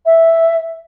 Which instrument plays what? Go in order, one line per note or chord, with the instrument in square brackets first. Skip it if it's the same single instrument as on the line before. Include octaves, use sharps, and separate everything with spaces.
[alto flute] E5